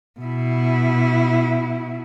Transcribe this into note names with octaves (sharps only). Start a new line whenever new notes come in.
B2 E4